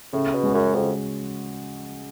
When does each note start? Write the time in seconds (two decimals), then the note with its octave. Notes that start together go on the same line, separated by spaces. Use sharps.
0.13 A2 C#3
0.33 B2
0.43 G#3 C#4 F#4
0.54 F#2
0.75 F2 C#3